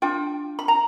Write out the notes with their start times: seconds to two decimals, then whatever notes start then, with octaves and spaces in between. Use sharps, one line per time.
0.02 D4 F4 G5
0.59 B5
0.68 A#5